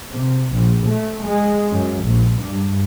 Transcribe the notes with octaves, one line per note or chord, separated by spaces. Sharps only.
C3
A#1
A3
G#3
F#2
A#1
G2